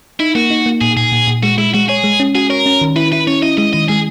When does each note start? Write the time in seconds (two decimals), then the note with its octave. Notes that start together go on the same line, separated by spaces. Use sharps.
0.20 D#4 E4
0.35 A#3 F#4
0.50 D#4
0.66 A#3
0.81 A#2 G#4
0.97 A#2 G#4
1.12 A#2
1.27 A#2
1.43 G#3 F#4
1.58 G#3 E4
1.74 G#3 F#4
1.89 G#4 C#5
2.04 G#3
2.20 C#4
2.35 F#4 G#4
2.50 A#4 C#5
2.66 C#4
2.81 D#3
2.96 E4 B4
3.12 E4 B4
3.27 C#4 C#5
3.42 E4 D#5
3.58 G#3 D#5
3.73 D#3 D#5
3.88 G#3 G#4